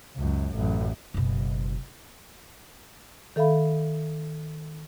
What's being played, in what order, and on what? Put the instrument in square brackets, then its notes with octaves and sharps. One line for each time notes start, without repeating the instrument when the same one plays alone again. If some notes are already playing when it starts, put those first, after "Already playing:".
[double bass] C#2 F#2
A1 F#2
[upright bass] F#1 B2
[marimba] D#3 A4 E5 F5 B5